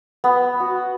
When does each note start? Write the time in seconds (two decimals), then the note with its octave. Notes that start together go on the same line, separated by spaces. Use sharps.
0.24 B3
0.60 F#4